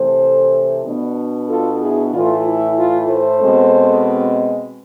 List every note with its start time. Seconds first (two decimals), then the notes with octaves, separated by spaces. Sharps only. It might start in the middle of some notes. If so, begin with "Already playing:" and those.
Already playing: C3 E3 A3 A4 C5
0.85 B2 B3 D4
1.49 F4 A4
1.81 E4 G#4
2.14 A2 E3 A3 F4
2.46 E4
2.78 F4
3.10 A4 C5
3.42 B2 G#3 C4